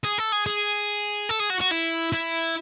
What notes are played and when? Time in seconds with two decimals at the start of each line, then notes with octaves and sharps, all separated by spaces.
0.04 G#4
0.18 A4
0.32 G#4
0.46 G#4
1.29 A4
1.40 G#4
1.50 F#4
1.61 F#4
1.71 E4
2.13 E4